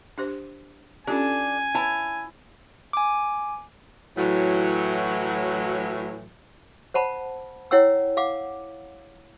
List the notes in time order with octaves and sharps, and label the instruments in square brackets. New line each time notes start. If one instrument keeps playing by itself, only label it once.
[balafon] D4 G4 C5
[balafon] C#4 F4 G4 [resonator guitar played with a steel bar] D4 A4 [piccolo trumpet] G#5
[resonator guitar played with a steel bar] E4 C#5 A5 [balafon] B4
[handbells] G#5 D6
[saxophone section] A2 E3 F#3
[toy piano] C5 F#5 A5 B5
E4 C#5 F#5 G5 E6
F5 F#5 D6